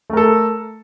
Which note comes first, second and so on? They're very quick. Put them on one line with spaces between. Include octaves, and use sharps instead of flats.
A3 A#4 A4